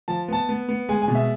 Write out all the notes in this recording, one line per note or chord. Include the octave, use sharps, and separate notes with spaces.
F3 A5
B3 A5
B3
B3
G#3 G#5
G#5
B2
E5